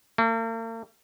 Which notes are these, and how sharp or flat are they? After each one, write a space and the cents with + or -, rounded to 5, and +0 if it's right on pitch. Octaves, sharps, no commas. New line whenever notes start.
A#3 -45